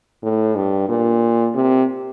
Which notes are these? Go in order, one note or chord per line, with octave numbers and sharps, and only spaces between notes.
A2
G2
A#2
C3